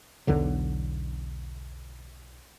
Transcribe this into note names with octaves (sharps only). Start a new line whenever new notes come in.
B1 E2 D3 F#3